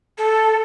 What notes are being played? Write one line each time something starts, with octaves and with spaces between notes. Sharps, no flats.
A4